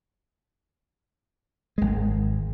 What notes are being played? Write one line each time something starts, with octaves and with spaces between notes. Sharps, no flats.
G#1 G#3